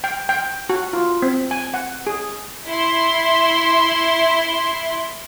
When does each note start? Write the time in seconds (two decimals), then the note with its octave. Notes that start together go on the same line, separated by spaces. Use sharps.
0.04 G5
0.29 G5
0.70 F#4
0.93 F4
1.22 C4
1.51 G#5
1.74 F#5
2.07 G#4
2.67 E4 C6